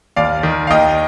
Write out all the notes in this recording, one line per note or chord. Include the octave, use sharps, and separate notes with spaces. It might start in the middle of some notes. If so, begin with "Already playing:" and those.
D#2 D5 F5
D#3
F5
D#2 D#5 G5